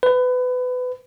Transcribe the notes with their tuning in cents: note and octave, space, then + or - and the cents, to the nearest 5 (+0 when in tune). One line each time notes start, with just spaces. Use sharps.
B4 +25